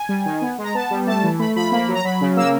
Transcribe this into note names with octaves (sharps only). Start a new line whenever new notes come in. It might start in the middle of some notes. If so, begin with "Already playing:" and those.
Already playing: G#5
G3
D#3
B3
G#3
A#5
B3 A5
G3
A3 A5
E3
A3 B5
F3 B5
A#3
F#3
A#5
F#3 B5
C#3
A#3 E6